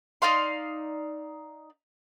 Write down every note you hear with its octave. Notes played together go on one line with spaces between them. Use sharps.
D#4 D5 F5 C6